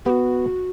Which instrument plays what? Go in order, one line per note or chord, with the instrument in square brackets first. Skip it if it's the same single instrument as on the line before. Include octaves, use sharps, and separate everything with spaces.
[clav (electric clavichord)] B3 [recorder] F#4 G4